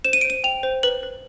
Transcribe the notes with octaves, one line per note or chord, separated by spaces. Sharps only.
C5 E7
D#7
C5 D7
D#7
G5 F7
C5
B4 F#7
B4